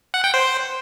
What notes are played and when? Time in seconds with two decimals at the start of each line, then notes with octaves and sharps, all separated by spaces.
0.14 F#5
0.24 G5
0.34 C5